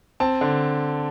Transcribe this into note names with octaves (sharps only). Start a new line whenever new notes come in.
C4 A5
D3